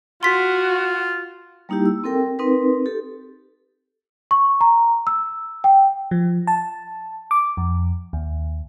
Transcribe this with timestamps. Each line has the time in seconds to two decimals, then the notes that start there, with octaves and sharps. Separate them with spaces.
0.23 F4 F#4 C6 B6
1.69 G3 A#3 D#4 E4 G4
1.86 E6
2.04 C4 A4 A#4 G5
2.39 C4 D#4 A#4 B4
2.86 G4 A4
4.31 C#6
4.61 A#5
5.07 E6
5.64 G5
6.11 F3
6.47 A5
7.31 D6
7.57 F2
8.13 D#2